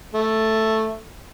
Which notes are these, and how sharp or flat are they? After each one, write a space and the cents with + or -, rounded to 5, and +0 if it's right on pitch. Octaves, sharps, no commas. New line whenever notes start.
A3 +0